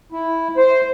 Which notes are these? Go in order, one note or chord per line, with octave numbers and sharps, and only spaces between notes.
E4
C5